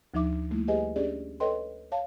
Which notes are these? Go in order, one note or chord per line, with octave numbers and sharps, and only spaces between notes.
D2 F3 D#4 E5 D6
G3 A3 A#3 E4
G4 G#4 B4 D#5 G#5
C#4 D4 G4 G#4 D5
A4 B4 C#5 D#5 G5 C6
C#5 F5 A5